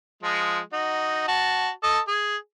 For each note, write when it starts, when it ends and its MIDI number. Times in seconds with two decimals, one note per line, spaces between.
0.23 0.59 53
0.23 0.59 56
0.73 1.26 63
0.73 1.26 66
1.28 1.69 66
1.28 1.69 81
1.83 1.99 69
1.83 1.99 75
1.83 1.99 81
2.08 2.37 68